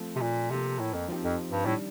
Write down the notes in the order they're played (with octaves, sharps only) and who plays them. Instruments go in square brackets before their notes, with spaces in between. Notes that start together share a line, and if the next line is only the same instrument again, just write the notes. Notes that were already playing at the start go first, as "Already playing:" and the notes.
Already playing: [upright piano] F3 A3 C4
[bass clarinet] C3
A#2
[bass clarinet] C3 [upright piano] F3 A#3 F4 A4
[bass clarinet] A2
F2
[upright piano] F3 C4 D#4 G4
[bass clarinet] F2
G2
[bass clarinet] A2 [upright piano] D#3 G3 D4